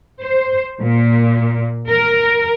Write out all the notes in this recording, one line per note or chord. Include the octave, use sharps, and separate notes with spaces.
C5
A#2
A#4